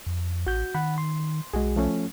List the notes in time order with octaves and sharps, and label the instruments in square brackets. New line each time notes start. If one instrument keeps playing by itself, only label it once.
[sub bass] F2
[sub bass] A1 [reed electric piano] F#4 G6
[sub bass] D#3 [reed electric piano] F#5 B5
[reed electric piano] C6
[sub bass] B1 [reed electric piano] G#3 F#4 G#4
[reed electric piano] F3 A3 C#4